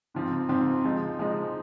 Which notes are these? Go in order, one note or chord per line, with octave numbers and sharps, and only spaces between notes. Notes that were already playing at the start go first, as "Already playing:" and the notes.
G#2 F3 C4
G#2 F3 C4
F3 G#3 D#4
F3 G#3 D#4